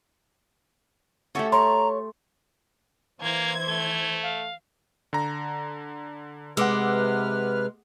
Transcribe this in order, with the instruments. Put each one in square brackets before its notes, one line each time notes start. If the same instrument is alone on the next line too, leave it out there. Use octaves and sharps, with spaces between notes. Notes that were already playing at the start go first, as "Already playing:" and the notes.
[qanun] A3 G4 A4 [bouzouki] C#4 F#4 E5
[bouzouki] C#5 [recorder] A#5 [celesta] C6
[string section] E3 C5 G#6 [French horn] A#3
[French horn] A3 [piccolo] G7
[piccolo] F5
[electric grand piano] D3 A#5
[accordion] C3 B4 F6 [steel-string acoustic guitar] G#3 [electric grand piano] F#5 D6 E6